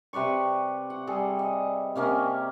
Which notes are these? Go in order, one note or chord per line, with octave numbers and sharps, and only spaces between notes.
C3 B4 D5 C#6
F#5
G3 G#4 A4
D#5
C3 A#3 C#4 D#5